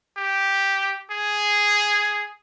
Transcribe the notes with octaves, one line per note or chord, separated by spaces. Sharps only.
G4
G#4